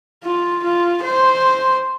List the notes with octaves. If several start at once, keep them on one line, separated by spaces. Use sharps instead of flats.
F4
F4
C5